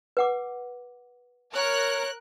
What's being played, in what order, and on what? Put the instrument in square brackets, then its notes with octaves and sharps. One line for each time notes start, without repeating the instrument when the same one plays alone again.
[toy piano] B4 F#5 D6
[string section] A#4 F#6 [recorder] C#5